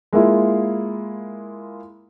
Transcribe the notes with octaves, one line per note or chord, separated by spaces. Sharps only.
G#3 A#3 E4 F4